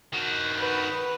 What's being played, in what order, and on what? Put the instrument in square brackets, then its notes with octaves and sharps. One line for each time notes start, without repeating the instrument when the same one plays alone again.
[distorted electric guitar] D#3 F#4
[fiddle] B4